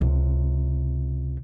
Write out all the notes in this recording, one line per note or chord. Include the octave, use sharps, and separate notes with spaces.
C#2 C3